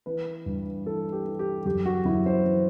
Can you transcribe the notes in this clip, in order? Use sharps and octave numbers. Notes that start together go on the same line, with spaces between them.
E3 B4
G2
E3 A4
G4
E3
G4
F#2 G4
F#4
F#2 E4
C5
E3